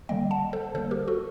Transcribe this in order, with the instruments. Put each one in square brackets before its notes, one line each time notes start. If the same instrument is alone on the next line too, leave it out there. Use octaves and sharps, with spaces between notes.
[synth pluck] D3 G3 A#3 D#5 G5
F#5 A5
A4 C5
D3 G3 A#3 A4 C5
G4 A#4
F#4 A4